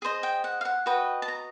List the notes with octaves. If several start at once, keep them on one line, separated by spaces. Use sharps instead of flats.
G#4 C5 D#5
G5
F#5
F5
F#5
F#4 B4 D#5 G5
A5
A#5